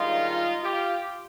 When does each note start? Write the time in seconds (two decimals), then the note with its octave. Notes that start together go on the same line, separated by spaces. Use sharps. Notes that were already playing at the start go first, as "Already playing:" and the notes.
Already playing: G2 D#3 G#3 D#4 F4
0.64 F4 G4